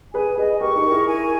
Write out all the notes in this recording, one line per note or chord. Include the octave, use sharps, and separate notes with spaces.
G#4 B4 G#5
G#4 B4 D#5
G4 A#4 C#6
D#4 G4
A#4
E4 G#4
G#5